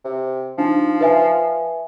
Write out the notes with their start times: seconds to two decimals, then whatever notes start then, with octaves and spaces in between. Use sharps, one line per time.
0.04 C3
0.58 F3 D4 D#4
1.01 B4 E5 G#5